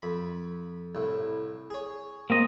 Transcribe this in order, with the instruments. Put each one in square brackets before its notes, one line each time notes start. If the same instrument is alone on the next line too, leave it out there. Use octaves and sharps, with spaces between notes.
[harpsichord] F2 B5
C2 A2
G#4 C#5
[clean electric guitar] A#3 C4 D#5